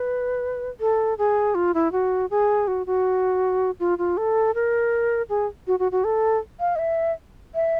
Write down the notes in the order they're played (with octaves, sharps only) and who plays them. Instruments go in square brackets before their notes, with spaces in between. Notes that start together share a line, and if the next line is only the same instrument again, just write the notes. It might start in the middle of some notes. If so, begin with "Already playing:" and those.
Already playing: [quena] B4
A4
G#4
F4
E4
F#4
G#4
F#4
F#4
F4
F4
A4
A#4
G#4
F#4
F#4
F#4
A4
F5
D#5
E5
E5